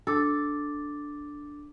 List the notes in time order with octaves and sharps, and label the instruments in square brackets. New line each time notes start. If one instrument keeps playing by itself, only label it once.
[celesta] D4 D6 A6 [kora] A4